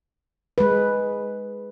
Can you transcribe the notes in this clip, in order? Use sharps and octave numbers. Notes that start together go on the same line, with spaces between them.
G#3 B4